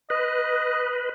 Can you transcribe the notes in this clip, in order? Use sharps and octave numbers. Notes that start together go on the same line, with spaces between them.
B4 D#5